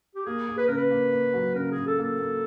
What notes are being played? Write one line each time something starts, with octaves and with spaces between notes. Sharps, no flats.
G4
A#3 G#4
A#3
B4
C#3 A#4
B4
A#3
A#3
F#3
C#3 A#4
G#4
C#3
A4
A#3 A4
A#3